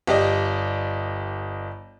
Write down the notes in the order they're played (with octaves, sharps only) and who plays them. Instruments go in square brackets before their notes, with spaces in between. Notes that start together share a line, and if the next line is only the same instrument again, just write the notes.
[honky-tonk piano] G1 G4 D5 D#5